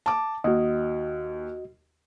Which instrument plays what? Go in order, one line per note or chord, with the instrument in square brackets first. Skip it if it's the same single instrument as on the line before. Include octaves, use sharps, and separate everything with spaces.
[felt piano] A5 D6
[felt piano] D#2 [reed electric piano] F#4 D#5